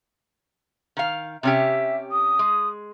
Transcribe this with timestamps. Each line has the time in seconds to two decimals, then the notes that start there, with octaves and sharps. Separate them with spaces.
0.97 D#3 F5
1.43 C3 C#4 G4 E5
2.12 D#6
2.39 G#3